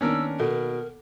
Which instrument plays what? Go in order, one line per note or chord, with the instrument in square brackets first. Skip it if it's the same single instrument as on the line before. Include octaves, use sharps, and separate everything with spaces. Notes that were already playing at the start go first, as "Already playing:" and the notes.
[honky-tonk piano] D#3 A#3 B3 [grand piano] C#4 D4 A#4 [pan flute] E6
[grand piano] B2 [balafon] A4 [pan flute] A#4